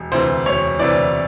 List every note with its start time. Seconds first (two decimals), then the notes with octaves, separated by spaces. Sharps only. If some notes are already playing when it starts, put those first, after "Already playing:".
Already playing: E1
0.12 D2 C3 E3 C5
0.46 E1 C#5
0.79 D2 C3 E3 D5